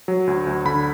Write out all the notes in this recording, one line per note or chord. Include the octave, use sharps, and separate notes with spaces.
F#3
D2
D2
D3 B5